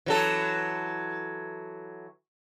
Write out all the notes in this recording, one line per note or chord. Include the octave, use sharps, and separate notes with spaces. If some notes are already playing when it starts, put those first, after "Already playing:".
E3 F#3 A4